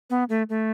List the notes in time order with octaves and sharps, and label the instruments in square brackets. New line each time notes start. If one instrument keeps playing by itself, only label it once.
[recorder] B3
A3
A3